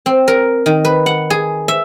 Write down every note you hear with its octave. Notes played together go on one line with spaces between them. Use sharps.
C4
A#4
D#3
B4
F#5
G#4
E5